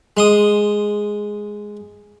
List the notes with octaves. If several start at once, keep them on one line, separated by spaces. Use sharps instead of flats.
G#3 C6 D#6